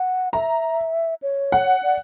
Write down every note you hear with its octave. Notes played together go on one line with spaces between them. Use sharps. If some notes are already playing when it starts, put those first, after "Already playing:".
Already playing: F#5
E5 A#5
C#5
F#5
D5